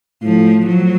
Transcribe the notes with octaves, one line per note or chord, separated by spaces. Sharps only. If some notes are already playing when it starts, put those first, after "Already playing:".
A2 F3
F3 F#3